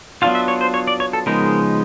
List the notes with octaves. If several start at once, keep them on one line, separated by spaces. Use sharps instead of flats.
F#3 B3 D4 F4 F5
E5
C#5
C5
C#5
D5
C#5
A4
C#3 F3 G#3 B3 D#4 A#4